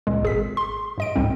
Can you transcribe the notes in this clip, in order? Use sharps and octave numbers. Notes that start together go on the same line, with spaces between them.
C#2 A#2 G#3
G#1 G#4 B6
C6
G2 D#5 D7
C2 G#2 G3 C4